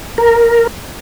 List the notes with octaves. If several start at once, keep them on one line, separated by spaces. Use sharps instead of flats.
A#4